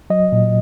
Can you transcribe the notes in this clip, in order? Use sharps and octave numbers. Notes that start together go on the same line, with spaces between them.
F#3 D#5
A#2